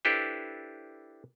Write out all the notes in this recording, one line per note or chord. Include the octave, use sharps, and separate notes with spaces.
D4 E4 G4 A4 B4 C5